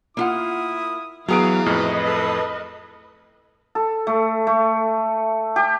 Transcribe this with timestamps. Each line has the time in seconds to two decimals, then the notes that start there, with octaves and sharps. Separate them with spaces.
0.17 A#3 E4 F4 F#5 D#6
1.28 E3 F#3 B3 G#4 F5 A#5 D7
1.66 F2 A2 B4 D#5 F6
2.04 A4
3.75 A4
4.07 A3
4.47 A3
5.56 G4